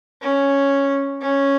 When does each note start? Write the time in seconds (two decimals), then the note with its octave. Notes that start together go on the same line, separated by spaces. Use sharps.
0.22 C#4
1.22 C#4